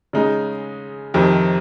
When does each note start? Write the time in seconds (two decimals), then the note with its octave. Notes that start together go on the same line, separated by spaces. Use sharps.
0.13 C#3 G#3 D#4
1.14 F2 C3 D#3